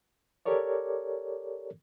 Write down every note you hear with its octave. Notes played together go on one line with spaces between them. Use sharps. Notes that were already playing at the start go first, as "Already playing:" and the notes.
G4 A4 A#4 C#5 D5